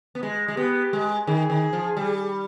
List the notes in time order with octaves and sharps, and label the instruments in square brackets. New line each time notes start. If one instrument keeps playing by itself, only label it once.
[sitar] B3
G#3
G#3
[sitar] B3 [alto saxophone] G4
[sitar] G#3
[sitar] D#3 [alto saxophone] G#4
[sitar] D#3
F3
G3